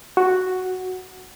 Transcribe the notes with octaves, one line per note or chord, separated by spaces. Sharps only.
F#4